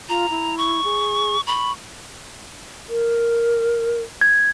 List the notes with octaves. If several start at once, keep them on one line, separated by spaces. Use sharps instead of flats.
F4 A#5
E4
C#6
G#4
B5 C#6
A#4
G#6